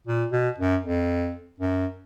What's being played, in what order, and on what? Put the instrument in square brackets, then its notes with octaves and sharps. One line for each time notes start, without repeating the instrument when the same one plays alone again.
[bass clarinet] A#2
B2
F#2
F2
F#2